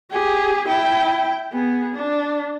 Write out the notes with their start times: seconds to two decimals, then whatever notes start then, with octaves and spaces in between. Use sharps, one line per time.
0.10 G4 G#4
0.68 E4 G5
1.52 B3 G#4
1.95 D4